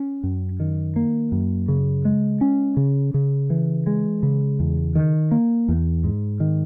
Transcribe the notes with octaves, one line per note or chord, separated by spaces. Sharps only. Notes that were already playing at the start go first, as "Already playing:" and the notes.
Already playing: C#4
F#2
D#3
A#3
F#2
C#3
G#3
C#4
C#3
C#3
E3
G#3
C#3
E2
D#3
A#3
E2
G#2
D#3